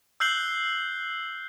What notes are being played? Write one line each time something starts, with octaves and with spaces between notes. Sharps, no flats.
E6 F#6 G6 C7 F#7 G7